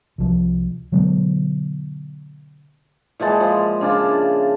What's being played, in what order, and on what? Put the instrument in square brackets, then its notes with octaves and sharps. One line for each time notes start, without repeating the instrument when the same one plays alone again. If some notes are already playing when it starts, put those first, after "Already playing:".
[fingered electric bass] C2 F3
B2 D3 F#3 B3
[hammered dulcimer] A#2 E3 G#3 A5
F3
C#3 D4 F4